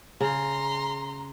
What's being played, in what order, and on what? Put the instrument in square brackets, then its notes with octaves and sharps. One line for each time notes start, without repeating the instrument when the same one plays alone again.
[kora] C#3 [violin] A#5 C6